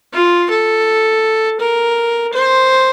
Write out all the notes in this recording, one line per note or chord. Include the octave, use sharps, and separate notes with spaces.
F4
A4
A#4
C5